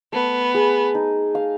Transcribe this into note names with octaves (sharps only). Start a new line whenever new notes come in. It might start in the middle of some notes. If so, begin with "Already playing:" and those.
A3 B3
G#4
D#4
F5